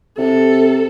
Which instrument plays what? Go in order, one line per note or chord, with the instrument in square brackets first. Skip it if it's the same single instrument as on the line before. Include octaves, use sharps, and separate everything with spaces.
[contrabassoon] C3 [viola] A4